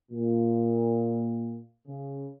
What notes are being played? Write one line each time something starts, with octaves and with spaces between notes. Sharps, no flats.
A#2
C#3